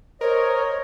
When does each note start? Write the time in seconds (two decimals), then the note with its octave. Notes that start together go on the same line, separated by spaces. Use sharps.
0.21 A#4 C5 C#5 D#5